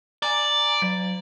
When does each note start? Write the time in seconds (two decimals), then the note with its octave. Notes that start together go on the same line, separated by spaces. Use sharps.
0.22 D5 G#5 A#5
0.82 F#3